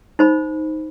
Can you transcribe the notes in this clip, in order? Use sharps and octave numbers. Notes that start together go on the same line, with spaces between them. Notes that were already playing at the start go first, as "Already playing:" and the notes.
D#4 C5 B5